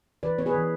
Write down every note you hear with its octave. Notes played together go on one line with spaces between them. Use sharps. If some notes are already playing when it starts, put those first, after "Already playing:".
E3 B4 D5
B3 C#5
G#4 B4
E3